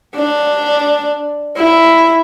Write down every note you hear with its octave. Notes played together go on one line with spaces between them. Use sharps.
D4
E4